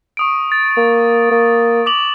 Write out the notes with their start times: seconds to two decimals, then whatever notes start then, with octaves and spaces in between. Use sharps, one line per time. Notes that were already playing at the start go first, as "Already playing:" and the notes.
0.17 C#6 D#6 D7
0.52 A6
0.77 A#3
1.31 A#3
1.86 D6 F7 F#7